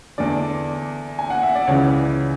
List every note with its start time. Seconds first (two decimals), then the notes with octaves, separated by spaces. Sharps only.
0.18 E2 D3 D5
1.19 G#5
1.30 F#5
1.43 E5
1.55 D5
1.67 C#2 C#3 E3 C#5